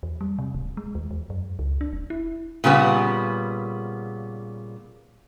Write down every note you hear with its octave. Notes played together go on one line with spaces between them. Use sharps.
E2
G3
C3
D1
G#3
D#2
E2
F#2
C#2
D4
E1
E4
A#2 C#3 G3 B3